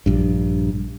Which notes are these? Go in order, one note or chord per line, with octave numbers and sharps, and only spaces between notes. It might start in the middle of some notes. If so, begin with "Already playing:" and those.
A#1 G2